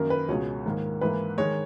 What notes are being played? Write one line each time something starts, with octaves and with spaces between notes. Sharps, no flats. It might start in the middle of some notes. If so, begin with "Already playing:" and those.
Already playing: F#2 D#3 A#3 A#4
B4
C#2 B2 G#3 C#5
G#2 D#3 A#3
G#2 E3 A#3 B4
D#3 G#3 C#5